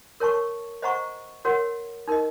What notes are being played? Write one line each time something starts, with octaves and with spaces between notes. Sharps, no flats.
A#4 C#5 A5 C#6
C5 D#5 F#5 A#5 C#6
F#4 A#4 C#5 F#5
D#4 A#4 D#5